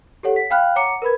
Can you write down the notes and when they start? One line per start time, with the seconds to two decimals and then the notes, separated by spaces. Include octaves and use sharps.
0.23 G4 A4 C#5 F#5
0.36 B6
0.50 F5 G5 B5 F6 F#6
0.76 C#5 F#5 A#5 D6 C#7
1.02 A#4 B4 B5 G#6